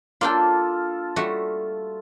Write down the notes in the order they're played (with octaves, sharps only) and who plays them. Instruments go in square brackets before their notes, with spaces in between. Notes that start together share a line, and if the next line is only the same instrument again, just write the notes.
[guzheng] A#3 D4 G5 [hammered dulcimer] F4 A4
[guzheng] G3 A3 F#4